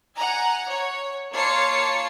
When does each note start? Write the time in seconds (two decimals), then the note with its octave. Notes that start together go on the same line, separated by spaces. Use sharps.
0.16 F#5 G#5 A#5
0.70 C#5
1.34 A#3 F4 C#5 A5 C7 C#7